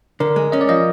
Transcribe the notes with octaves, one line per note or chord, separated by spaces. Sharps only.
D3 A#4
G#3
C#4 D#5
D5
F3 D#5